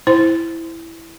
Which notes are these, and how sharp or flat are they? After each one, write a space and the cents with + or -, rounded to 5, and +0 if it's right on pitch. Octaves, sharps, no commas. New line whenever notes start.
E4 +0 C5 +0